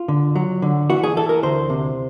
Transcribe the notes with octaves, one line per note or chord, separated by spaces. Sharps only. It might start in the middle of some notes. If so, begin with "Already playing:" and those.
Already playing: F4
D3
F#3
D3
E3 F#4
G#4
E3 A4
A#4
D2 C5
C3